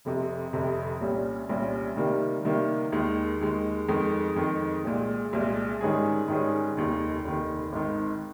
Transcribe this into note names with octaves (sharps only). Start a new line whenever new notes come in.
F1 F2 C3
F1 F2 C3
C2 A#2 G3 C#4
C2 A#2 G3 C#4
C3 D#3 G3 A#3
C3 D#3 G3 A#3
D#2 D#3 G#3
D#2 D#3 G#3
F2 D#3 G#3
F2 D#3 G#3
C2 A#2 G#3
C2 A#2 G#3
G#2 D#3 G3 C#4 G#4
G#2 D#3 G3 C#4 G#4
F1 D#2 D#3
F1 D#2 D#3
G#1 G#2 D#3